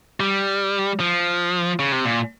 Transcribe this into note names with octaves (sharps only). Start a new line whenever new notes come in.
G3
F3
C#3
C3
A#2